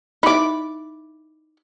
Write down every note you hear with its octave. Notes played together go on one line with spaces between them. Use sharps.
D#4 E4 B5 D6